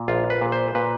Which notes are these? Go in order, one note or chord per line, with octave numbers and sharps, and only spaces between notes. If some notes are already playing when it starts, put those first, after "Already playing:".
Already playing: A#2
A#1 F4
B4
A#2
C5
A#2 B4